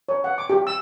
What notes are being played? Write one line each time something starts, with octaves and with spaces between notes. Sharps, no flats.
C#5
F#5
D6
G4
E6